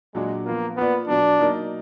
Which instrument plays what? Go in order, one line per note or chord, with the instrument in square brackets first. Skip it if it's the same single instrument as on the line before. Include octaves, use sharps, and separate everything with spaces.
[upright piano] A#2 F#3 D4 F#4 [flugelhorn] G#3
[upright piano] F3 B3 F4 [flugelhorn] A#3
[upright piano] A#3 F4 B4 D5 [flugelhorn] B3
[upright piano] B2 F#3 B3 [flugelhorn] D4
[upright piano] F#3 A#3 D#4 A#4 D5